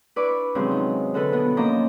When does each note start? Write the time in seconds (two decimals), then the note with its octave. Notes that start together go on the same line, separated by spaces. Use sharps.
0.16 D4 E4 B4 D5 C#6 D6
0.55 C3 D#3 F3 F#3 G#3 C#4
0.71 D#4
1.14 D3 F#4 A4 B4 F#6
1.32 B2 B3
1.57 F3 A#3 C#4 D#5 A#5 D6